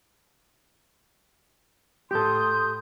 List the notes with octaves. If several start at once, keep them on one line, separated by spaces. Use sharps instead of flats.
A2 G4 A4 C6 D#6 G6